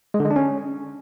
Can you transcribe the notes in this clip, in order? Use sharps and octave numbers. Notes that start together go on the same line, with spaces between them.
G#3
D3
G#3
D4
C#4